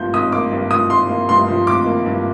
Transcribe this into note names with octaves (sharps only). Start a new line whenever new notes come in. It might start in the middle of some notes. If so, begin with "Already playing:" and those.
Already playing: G#1 G2 F3 A#3 G6
G#1 D#6
A#3 D6
G2
F3 D#6
G#1 C6
A#3
G2 C6
F3
G#1 D6
A#3
G2